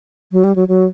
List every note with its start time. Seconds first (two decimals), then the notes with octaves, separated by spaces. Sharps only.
0.32 F#3
0.44 G3
0.56 F#3
0.68 F#3